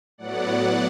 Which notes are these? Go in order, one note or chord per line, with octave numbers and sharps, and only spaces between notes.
A2 F#3 B3 D5 F#5